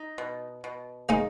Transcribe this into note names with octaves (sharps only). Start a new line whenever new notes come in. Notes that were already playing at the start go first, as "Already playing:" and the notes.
Already playing: D#4
B2
B2
G#3 A#3 D#4